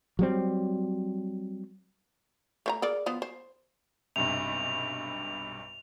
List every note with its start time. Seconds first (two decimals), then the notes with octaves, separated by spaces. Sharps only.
0.19 F#3 G3 C4
2.66 A3 C5 A#5
2.82 G#4 A#4 D5
3.06 F3 B3 C5
3.22 C5
4.16 B1 G2 C3 F7